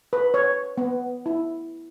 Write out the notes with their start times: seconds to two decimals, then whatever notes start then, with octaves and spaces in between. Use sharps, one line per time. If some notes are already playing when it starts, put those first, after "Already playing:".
0.13 B4
0.34 C#5
0.78 B3
1.26 E4